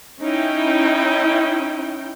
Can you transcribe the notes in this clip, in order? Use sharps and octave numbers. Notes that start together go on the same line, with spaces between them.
C#4 D#4 E4 G5